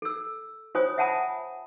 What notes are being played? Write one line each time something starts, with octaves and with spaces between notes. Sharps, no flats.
A4 E6
F4 C5 C#5 G#5 D#6
E5 F#5 G#5 A5 B5 D#6